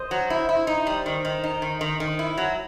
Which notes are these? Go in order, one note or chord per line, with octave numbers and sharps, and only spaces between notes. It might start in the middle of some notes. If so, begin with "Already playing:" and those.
Already playing: C5 D#5
F#3
E4
E4
D#4
G3
D#3
D#3
D#4
D#3
D#3
D#3
E4
F#3